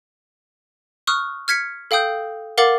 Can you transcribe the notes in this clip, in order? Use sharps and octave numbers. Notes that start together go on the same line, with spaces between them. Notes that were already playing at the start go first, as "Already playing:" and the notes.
C#6 D#6 F6 F#6
F6 G#6 B6 C#7
A4 F5 G5 D#6 G6
A#4 F5 F#5 D6 A6 F#7